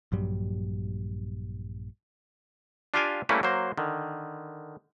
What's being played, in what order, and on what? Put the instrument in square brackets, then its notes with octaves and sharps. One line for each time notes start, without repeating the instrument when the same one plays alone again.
[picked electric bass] A#1 G2 F#3 G3
[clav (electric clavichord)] D4 F4 G4 F5 G5 G#5
G3 A3 A#3 C#4 E4 B4
F#3 A#3 C5
D3 D#3